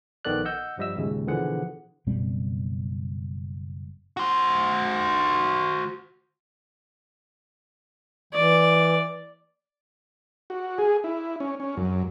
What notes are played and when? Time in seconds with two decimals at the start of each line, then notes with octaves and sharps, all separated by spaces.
0.25 A#1 D#3 B3 A4 D5 F#6
0.45 D#5 F#5 E6 G6
0.78 G2 F3 G3 D#5 E5 E6
0.96 D#2 A#2 C#3 G#3
1.27 B2 D3 E3 F3 G#4 F#5
2.07 F#1 B2 G3 C4
4.17 F#4 C5
8.33 E3 D5
10.50 F#4
10.78 G#4
11.04 E4
11.40 C#4
11.60 C#4
11.77 F#2